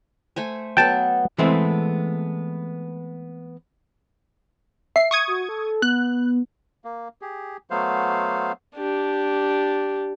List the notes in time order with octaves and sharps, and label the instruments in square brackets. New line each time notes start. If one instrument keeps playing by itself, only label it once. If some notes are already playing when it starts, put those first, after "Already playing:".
[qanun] A3 C5 G#5
[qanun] F#3 B3 A4 [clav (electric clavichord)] G5 A5
[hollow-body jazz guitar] E3 G#3 A3 B3 C4 E4
[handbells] E5 [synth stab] C7
[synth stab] C#6 D#6 G#6
[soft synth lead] F#4
A4
[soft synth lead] B3 [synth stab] F#6
[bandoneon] A#3
G4 G#4
F#3 A3 B3 C5 F5
[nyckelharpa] D4 G4